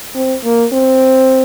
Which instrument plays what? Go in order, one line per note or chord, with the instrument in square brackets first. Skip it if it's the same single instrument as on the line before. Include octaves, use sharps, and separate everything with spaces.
[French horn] C4
A#3
C4